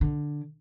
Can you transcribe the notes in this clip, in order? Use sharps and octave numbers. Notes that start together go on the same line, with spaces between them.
D3